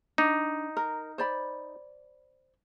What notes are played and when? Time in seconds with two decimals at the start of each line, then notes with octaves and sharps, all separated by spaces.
0.18 D4 D#4
0.77 A#4
1.18 C5 D5 B5